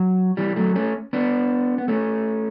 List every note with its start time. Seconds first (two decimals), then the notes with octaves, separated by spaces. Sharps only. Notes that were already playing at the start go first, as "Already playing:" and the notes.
Already playing: F#3
0.37 E3 G3
0.56 F#3 A3
0.75 A3 C#4
1.13 B3 D4
1.78 B3
1.88 A3 C#4